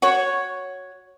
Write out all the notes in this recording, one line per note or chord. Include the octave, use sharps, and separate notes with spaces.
F#4 C#5